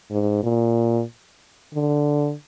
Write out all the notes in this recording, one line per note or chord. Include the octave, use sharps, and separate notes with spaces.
G#2
A#2
D3